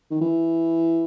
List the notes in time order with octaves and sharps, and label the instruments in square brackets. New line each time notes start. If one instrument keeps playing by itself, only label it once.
[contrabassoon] D#3
E3